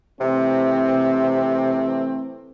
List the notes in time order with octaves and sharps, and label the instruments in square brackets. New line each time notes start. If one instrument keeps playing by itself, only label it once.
[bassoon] C3 [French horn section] E3 A3 C4